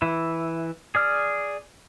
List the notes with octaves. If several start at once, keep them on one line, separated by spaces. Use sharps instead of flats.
E3 E4
G#4 D5 F6